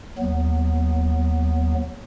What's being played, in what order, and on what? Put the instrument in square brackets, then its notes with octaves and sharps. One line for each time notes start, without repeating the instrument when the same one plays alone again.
[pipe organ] D#2 F#3 B3